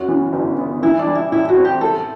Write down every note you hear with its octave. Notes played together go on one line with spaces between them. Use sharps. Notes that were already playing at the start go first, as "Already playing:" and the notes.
Already playing: F#2 F#4
E3
G1
B3
E3 E4
D4
G3
E4
A2 E4
F#4
C4
G4
A3 A4